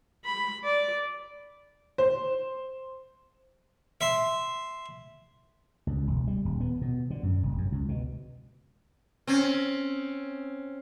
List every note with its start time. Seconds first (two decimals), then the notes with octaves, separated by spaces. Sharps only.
0.25 B5
0.64 D5
1.98 C5
4.01 E5 C6
5.87 C#2
6.07 E1
6.27 G3
6.45 D#1
6.60 B3
6.82 B2
7.10 D3
7.23 F#2
7.43 F1
7.58 F#2
7.72 C#2
7.89 B2
9.27 C4 C#4